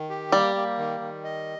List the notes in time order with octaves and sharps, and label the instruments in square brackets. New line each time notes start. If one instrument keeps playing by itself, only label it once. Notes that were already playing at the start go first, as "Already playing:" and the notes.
Already playing: [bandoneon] D#3
G4
[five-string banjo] G3 [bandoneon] A#3
[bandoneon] A#3
D#3
D#3
D#5